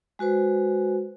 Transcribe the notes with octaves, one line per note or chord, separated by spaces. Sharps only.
G#3 F#4 B4 C5